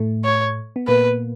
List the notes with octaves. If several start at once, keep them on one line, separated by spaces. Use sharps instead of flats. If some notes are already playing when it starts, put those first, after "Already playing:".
Already playing: A2 A3
C#5
B3
A#2 A#3 B4